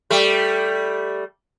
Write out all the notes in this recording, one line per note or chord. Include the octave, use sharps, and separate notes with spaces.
G3 A3